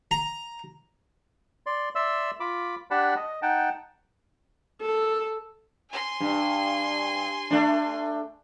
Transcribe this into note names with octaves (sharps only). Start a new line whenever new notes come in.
A#5
D5 C6
D5 E5 C6 E6
F4 B5 D6
D4 G4 D5 F#5 A5 B5
D#5
D#4 F#5 G5 A5
A4
G#5 C6
G2
A3 D4